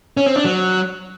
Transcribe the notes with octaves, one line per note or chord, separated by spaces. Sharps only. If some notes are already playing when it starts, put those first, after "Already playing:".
C#4
C4
D4
F#3